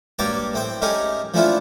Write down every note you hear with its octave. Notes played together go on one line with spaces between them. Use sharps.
G2 A#3 G4 C#5 A5 D6
A2 C4 G5
A3 C#4 D#4 G4 G#4 A#4
F3 A3 C#4 D4 E4 F4